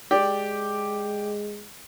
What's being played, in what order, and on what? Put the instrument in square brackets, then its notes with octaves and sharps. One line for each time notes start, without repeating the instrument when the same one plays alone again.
[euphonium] G#3 [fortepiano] G4 D5